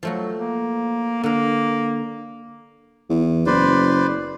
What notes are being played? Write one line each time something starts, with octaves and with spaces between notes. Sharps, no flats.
F3 F#3 A3 F#4
A#3
D3 A#3 A#4
E2
F#1 B4 C5 D5